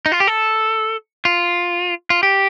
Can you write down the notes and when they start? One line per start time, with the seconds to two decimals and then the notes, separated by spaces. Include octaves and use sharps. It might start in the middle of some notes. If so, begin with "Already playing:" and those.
0.06 D#4
0.12 F4
0.20 G4
0.27 A4
1.25 F4
2.10 F4
2.23 G4